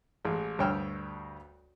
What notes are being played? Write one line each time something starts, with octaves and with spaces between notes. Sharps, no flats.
A1 G#3
D2 G2 C#5 G5 E6 F6